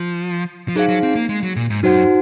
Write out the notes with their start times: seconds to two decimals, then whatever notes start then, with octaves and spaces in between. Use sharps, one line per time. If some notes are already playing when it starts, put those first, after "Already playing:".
Already playing: F3
0.68 F3
0.75 F#3 D#4 G#4 C5 F5
0.89 F#3
1.03 C4
1.15 A#3
1.29 G#3
1.43 F#3
1.56 A#2
1.70 G#2
1.83 F#2 D#4 F#4 C5 F#5